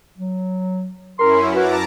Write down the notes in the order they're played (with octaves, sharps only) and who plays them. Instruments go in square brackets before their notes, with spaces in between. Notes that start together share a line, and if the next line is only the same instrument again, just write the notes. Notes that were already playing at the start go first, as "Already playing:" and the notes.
[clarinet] F#3
[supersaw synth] F#2 C#4 E4 [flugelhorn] A#4 [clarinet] C6
[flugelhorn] F#4 [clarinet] B4 [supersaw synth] A5 A#5 D6